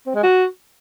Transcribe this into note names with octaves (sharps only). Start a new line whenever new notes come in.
C4
G#3
F#4